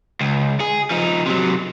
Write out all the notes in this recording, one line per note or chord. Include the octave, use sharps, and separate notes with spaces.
C#2
G#4
F3 D#4
C3 F#3